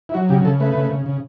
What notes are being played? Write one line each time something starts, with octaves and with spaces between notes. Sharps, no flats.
E4
F#3 F#4
C#3 G4
C#3 A4
A3 B4
C#3
C#3
C#3